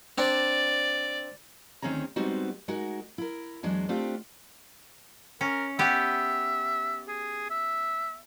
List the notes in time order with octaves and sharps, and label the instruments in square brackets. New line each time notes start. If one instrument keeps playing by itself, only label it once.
[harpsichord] C4 D4 [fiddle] D5
[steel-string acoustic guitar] D2 D#3 C4 C#4 G#4 A#5
G3 G#3 B3 C4 D#4 F#4
G#3 D#4 F#4 A#4
E4 A#4
E2 F#3 G#3 D4
A3 C4 D4 F4 G4
[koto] C#4 [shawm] A#4
[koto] B3 G4 [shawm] E5
[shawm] G#4
E5